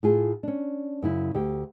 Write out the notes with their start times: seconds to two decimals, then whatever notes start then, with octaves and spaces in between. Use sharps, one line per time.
0.03 A2 F4 G#4
0.43 C#4 D4
1.02 F#2 C#3 E4
1.34 D2 G4